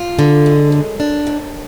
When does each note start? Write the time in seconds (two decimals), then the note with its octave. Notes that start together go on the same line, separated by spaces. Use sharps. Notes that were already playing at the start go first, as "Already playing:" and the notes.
Already playing: F4
0.19 D3
0.46 G#3
0.72 F#2
1.00 D4
1.27 D#2